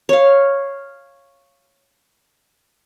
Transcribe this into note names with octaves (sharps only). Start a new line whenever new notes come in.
C#5 F5